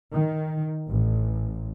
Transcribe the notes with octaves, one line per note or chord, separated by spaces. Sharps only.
D#3
A1